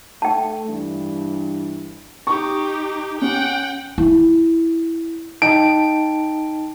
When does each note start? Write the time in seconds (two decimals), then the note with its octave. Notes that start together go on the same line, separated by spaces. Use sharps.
0.22 A3 G5 A5
0.66 G2 E3 D4
2.27 D#4 G4 C#6
3.21 C#4 F#5 G5
3.98 E4
5.42 D#4 G5 A5 D7